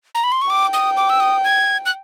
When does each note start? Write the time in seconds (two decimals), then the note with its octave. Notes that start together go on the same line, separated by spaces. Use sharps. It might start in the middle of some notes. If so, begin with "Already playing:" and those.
0.15 A#5
0.24 B5
0.32 C6
0.42 C#6
0.50 G5 D6
0.74 D#6
0.97 D6
1.09 E6
1.20 D#6
1.44 G#6
1.86 F#6